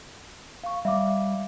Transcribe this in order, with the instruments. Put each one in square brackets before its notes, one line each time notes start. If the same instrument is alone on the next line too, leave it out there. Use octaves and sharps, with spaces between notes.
[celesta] F5 C#6
[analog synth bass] G3 [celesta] E5 F5 D6